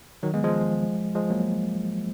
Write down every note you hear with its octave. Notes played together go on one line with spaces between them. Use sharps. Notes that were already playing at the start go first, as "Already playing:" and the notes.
D#3 F#3
G#3 B3
F3 G#3
F3 G#3
F#3 A#3